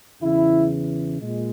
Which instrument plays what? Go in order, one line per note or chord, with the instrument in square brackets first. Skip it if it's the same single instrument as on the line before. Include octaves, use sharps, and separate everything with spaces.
[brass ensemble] E2 C#3 E3 E4
A#2 G#3